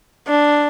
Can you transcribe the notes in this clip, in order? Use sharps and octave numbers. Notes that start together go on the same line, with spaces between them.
D4